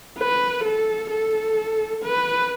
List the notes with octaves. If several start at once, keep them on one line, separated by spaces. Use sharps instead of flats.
B4
A4
A4
B4